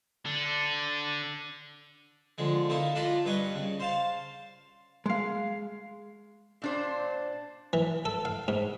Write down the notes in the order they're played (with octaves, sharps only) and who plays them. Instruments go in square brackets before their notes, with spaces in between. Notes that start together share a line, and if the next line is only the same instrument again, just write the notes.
[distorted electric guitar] D3 D4
[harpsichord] D3 F3 G#3
A3 A#3 D#4 E4
D4 F4 D5 D#5 A#5 B5
G2 G3 B4 D#5 G#5 C#6
C#3
C5 F5 A5
[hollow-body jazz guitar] G#3 F5
[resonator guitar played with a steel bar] A#2 D4 C5
[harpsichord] E3
A4
F5
G#2